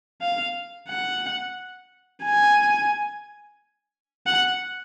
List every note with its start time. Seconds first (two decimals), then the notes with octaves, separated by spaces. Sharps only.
0.21 F5
0.89 F#5
2.24 G#5
4.27 F#5